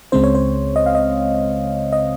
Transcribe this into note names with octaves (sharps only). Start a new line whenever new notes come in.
C#2 C#3 G#3 C4 C5
C#5
C5
D#5
F5
D#5
D#5